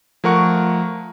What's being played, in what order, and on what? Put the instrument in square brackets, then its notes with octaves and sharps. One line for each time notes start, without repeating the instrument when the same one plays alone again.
[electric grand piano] F3 A3 A#4 F#5 C#6